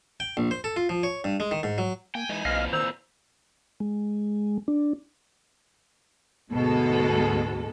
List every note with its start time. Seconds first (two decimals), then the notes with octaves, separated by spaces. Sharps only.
0.20 G5
0.37 A#1
0.51 C5
0.64 A4
0.76 F4
0.89 F3
1.03 C#5
1.24 G2
1.40 G#3
1.51 D#3
1.63 G#2
1.78 F#3
2.15 A#3 G5 G#5
2.29 E3 G#3 D#4
2.45 B1 A#2 E3 C4 D#5 F5 F6
2.73 D#3 C5 A#5 E6
3.80 G#3
4.68 D4
6.52 D2 G#2 B2 G#3 A4